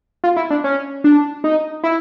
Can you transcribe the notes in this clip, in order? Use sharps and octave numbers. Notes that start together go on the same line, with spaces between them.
F4
E4
D4
C#4
D4
D#4
E4